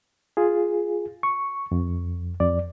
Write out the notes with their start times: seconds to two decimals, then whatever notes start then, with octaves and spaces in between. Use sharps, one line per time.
0.37 F4 G#4
1.23 C#6
1.72 F2
2.40 F2 D5